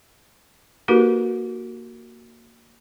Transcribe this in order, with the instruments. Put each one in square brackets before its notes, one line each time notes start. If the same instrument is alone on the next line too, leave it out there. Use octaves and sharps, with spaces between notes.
[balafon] A#3 D#4 F#4 G4 A#4 B4